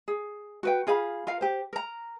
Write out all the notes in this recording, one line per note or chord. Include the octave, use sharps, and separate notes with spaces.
G#4
F#4 B4 G5
F4 G#4 F5 B5
F4 A#4 F5
G4 C5
A#4 A#5